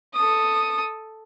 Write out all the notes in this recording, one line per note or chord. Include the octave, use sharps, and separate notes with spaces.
A4 D#6